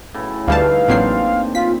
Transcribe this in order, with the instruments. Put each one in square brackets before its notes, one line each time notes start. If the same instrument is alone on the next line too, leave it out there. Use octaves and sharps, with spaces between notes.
[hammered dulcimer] A2 C#3 E4
[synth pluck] D2 G3 A5 [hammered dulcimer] E3 A3 D#4 [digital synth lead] F5
[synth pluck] A1 F#3 C7 [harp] A#3 C4 D4
[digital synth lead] F4 [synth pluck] B6